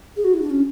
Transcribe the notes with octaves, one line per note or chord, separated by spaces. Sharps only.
G#4
F#4
E4
D4
C#4